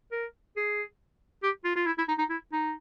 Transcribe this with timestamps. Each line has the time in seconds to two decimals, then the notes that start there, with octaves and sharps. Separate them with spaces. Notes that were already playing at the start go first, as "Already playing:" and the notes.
0.12 A#4
0.56 G#4
1.43 G4
1.64 F4
1.75 F4
1.86 E4
1.98 E4
2.08 D#4
2.19 D#4
2.30 E4
2.52 D#4